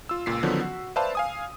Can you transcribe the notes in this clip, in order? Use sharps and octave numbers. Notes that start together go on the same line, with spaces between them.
F4 E6
C#2 A#2 B6 C7
D3 D#3 F3 F#3 B3 C#4
F#4
B4 C5 D5 E5 F5 A5
F5 G#5 D#6